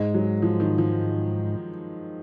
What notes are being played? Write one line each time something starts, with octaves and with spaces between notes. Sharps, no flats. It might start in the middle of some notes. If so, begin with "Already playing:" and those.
Already playing: G#2 G#3
F#3
F3
D#3
F3